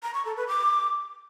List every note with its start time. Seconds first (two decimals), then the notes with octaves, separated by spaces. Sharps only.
0.03 A#5
0.14 C#6
0.25 A4
0.37 B4
0.48 D6